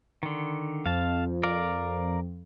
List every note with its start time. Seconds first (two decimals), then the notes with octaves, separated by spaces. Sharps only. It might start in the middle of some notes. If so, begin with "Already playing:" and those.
0.23 D3 D#3
0.86 F2 F5 A5
1.43 A#4 D5 F5